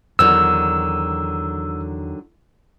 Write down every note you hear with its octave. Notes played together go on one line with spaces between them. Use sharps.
E2 D3 D#3 F#3 E6